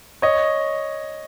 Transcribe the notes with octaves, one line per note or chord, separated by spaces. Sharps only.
C#5 D#5